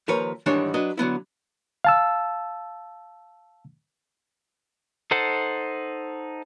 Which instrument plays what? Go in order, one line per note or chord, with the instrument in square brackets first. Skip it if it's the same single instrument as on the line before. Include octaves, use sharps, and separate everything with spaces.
[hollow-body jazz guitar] D#2 F3 A#4 B4 C#5
G#2 D#3 E3 G3 D4 C#5
F#3 D4 B4 D#5
D3 F#3 B3 E4
[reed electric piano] F5 A5 E6
[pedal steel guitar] D#4 A4 C5 F#5 A5